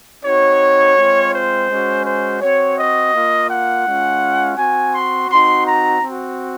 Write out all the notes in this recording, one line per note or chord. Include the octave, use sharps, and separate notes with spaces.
C4 D#4 F#4 C#5
G#3 C4 F4
C5
G#3 C#4 F#4
C5
C4 F#4 C#5
D#5
A#3 F4
F#5
G#3 C#4 F4
C4 F#4 G#5
C6
C4 D#4 F#4 C6
A#5
C4 F#4